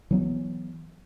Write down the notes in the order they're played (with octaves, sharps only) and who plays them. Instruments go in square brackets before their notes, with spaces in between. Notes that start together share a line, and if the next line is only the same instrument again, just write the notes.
[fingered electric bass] E3 F#3 B3